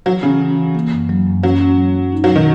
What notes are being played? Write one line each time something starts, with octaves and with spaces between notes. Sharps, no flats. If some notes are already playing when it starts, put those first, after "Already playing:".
E3 F#3
C#3 E3
E3
E3
A#3
F#2
F#3
F#2
F#3 C#4
C#4
F#3
F#3
D#4
F#3
B2
D#3